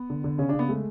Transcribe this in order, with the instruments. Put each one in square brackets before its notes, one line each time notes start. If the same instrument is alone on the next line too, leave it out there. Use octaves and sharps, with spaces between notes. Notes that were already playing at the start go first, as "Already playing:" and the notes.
Already playing: [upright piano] B3
[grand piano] D3
D3
[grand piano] C#3 [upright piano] C#4
[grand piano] C#3 [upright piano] D4
[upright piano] B3
[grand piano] G#3 [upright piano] A3